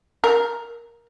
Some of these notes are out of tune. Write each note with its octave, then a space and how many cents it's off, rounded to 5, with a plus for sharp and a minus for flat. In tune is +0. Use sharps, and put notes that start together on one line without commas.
A#4 +10